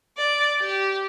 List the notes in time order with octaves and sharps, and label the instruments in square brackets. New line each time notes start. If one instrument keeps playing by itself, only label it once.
[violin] D5
G4